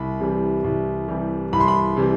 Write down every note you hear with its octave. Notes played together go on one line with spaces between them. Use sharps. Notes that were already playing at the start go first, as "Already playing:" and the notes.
Already playing: C2 B5
C3 E3 G3
C2
C3 E3 G3
C2 B5
C6
B5
C3 E3 G3